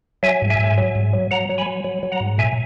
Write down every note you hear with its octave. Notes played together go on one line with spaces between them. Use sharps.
F#3 E5 G#5
G#2
E5 G#5
G#2
F#3
G#2
F#3
F#3 F#5 A#5
F#3
G#5 B5
F#3
F#3
F#3
F#5 A#5
G#2
A#2 E5 G#5